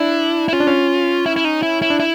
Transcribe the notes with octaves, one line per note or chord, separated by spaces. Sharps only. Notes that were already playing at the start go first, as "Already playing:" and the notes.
Already playing: D4 E4
E4
C#4 F4
D4
C#4
E4
E4
D#4
E4
E4
D4
E4